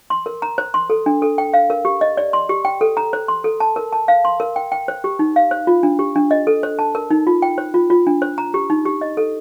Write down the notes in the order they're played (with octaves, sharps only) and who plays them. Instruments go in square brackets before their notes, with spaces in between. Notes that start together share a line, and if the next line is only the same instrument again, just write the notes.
[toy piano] C6
A#4
A#5
C5
C6
A4
D4
A4
G5
F5
A#4
G4
D#5
D5
C6
G4
G5
A4
A#5
C5
C6
A4
A5
A#4
A5
F5
C6
A#4
G5
G5
C5
G4
D#4
F5
C5
F4
D4
G4
D4
D#5
A4
C5
A5
A#4
D#4
F4
G5
C5
F4
F4
D4
C5
A#5
G4
D#4
G4
D#5
A4